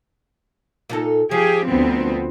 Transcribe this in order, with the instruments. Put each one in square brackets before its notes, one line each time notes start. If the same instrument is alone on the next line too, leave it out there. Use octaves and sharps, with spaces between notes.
[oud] A#2 D#4 A4
[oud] F3 [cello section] G4 G#4
[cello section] D2 B3 C4